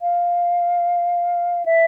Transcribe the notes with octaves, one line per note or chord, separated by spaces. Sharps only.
F5
E5